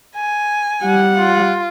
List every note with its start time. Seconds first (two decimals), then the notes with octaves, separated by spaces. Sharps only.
0.16 G#5
0.84 G3 F#5
1.18 F4